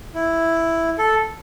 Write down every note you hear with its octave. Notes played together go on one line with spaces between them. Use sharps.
E4
A4